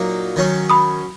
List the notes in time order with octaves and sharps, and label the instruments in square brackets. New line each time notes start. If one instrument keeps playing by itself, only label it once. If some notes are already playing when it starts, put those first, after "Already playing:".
Already playing: [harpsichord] A#2 F#3 A#3 D#4
D#3 F#3 C#4
[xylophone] B5 D#6